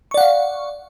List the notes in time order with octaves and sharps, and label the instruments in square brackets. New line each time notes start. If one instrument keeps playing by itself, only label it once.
[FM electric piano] C#6
D5
F#5
F5